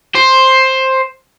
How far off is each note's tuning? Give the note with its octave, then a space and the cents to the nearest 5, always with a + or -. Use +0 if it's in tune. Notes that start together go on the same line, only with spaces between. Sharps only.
C5 +10